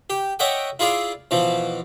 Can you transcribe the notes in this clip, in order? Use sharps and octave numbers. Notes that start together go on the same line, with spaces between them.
G4
C#5 D#5 E5 F#5 G5 D6
E4 F4 G#4 D5 F5
B2 E3 F3